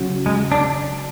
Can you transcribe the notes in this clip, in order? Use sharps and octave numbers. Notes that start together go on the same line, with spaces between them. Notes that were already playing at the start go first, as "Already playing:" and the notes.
Already playing: C#3 F#3 C#4 F#4
G#3
D4